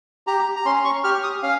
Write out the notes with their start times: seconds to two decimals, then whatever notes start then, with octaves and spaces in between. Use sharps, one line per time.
0.27 G4 A#5
0.56 A#5
0.65 C#4 C6
0.85 C#6
1.04 G4 F6
1.23 D#6
1.43 C#4 F5